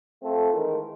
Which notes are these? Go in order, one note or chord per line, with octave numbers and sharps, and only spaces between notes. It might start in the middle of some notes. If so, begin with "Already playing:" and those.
A3 C4 F4 A4
D#3 E3 G#3 A#4